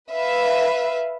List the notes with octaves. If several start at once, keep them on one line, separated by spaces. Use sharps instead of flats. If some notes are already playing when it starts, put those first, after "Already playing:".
B4 E5 F5